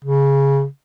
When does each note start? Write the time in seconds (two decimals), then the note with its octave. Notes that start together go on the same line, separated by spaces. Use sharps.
0.04 C#3